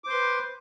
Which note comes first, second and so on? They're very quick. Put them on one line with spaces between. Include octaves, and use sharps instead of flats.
D6 C5 C6 B4